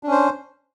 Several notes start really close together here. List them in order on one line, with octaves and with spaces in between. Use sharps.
D4 C#4 C5